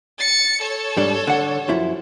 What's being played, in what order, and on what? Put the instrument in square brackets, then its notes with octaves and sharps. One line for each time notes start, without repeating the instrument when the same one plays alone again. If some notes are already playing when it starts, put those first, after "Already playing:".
[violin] A6 C#7
A4 C#5
[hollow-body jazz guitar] G#2 G3 D4
D3 F#5
F#2 F3 E4